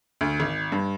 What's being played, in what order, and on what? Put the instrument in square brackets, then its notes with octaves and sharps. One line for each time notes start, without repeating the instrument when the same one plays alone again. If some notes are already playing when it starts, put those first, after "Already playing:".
[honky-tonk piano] D2
G#1
G2